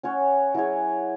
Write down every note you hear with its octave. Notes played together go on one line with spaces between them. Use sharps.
C#4 F#4 C#5
F#3 E4 G#4 C#5